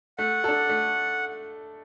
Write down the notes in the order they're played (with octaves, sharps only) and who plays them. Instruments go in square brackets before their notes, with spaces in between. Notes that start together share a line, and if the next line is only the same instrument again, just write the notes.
[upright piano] A3 [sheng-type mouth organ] F#5
[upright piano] D4 A4
A3